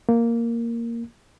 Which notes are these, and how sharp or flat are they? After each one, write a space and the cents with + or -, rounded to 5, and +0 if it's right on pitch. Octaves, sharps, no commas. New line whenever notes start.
A#3 -5